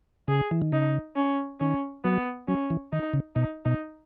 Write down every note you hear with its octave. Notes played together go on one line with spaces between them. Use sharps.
C#3 G#4
E3
D#3
C#3 D#4
C#4
D#3 C#4
F#3 B3
F#3 C#4
E3
D#3 D#4
C#3
B2 D#4
B2 D#4